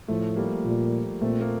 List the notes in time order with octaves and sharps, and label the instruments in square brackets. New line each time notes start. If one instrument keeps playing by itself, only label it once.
[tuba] A2 [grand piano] F3 A3
[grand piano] G3 A#3
[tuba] A#2
[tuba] A#2 [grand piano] A3 C4
[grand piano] A#3